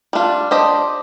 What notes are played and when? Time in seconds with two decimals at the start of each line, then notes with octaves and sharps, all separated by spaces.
0.13 G3 D4 F4
0.51 D4 G4 C5 D#5